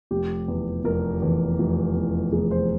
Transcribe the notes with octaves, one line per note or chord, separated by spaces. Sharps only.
F1 G4
E2 E3
F1 A#4
E2 E3
F1
E2 E3
F1 G#4
C5